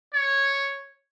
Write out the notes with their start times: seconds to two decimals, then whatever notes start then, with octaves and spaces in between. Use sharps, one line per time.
0.14 C#5